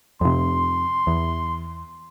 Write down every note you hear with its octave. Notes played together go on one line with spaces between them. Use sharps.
F2 C3 C6
E2